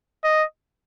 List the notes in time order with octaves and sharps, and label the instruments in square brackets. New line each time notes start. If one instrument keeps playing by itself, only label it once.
[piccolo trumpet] D#5